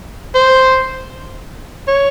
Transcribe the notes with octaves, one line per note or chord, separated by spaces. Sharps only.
C5
C#5